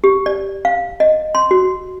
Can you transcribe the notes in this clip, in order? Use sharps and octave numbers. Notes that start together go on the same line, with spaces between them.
G4
D5
F5
D#5
C6
F#4